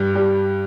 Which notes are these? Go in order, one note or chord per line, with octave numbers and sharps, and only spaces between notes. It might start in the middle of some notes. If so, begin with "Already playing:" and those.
Already playing: G2
G3